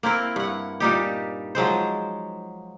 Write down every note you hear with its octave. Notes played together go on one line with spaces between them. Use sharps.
A#3 C4 E4 A#4
G2 F#5
A#2 G3 D#4 G4
F3 F#3 G#3 C5